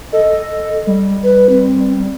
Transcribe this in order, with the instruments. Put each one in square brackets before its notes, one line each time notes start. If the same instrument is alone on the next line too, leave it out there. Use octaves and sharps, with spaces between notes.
[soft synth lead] A4 [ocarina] D#5
[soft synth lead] G3
[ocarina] B4
C4